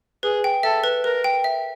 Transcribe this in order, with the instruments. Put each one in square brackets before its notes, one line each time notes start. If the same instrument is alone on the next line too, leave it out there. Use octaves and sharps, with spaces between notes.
[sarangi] G#4 [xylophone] B4
[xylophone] G5
[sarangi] A4 [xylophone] E5
[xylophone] B4
[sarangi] A#4 [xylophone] B4
[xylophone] G5
E5